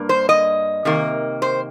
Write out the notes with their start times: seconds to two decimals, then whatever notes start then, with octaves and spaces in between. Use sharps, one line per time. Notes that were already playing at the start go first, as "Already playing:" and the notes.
Already playing: G2 A#3
0.09 C5
0.29 D#5
0.85 C3 D#3 A#3
1.42 C5